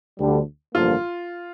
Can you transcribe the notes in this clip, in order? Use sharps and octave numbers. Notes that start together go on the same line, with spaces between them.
D2 D3 G3
A1 G2 D3 F3 A#3 F4